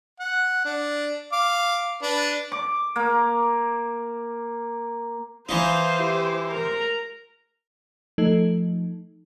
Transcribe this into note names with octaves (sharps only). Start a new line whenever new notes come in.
F#5
D4
F5 D6
D4 B4
D6
A#3
E3 D#4 C5 F5
E4 G4
A#4 A#5
F3 A3 D#4 A4